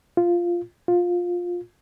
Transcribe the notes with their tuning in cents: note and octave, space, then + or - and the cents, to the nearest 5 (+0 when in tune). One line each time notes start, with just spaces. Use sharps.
F4 -5
F4 +15